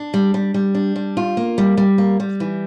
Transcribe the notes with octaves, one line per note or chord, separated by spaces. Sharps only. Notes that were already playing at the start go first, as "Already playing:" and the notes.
Already playing: D4
G3
G3
G3
D4
G3
F4
A#3
G3
G3
A#3
G3
E3